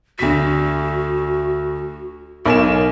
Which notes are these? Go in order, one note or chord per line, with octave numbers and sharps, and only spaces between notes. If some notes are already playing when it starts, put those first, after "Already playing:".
D2 F#4 B6
B1 A#4 G#5 E7